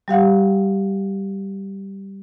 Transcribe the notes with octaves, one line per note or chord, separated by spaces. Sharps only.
G3 G4 F5 F#5